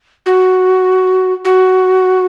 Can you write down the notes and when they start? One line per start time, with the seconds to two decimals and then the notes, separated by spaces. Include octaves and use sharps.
0.26 F#4
1.45 F#4